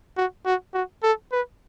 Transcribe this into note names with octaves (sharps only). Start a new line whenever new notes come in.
F#4
F#4
F#4
A4
B4